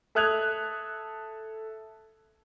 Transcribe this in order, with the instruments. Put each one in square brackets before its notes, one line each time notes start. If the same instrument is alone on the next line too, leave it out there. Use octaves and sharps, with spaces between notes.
[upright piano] A4 E5 D#6 F#6 G#6 F7